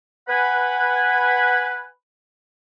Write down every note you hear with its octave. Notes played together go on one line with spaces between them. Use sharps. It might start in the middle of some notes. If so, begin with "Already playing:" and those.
B4 F#5 G#5 B5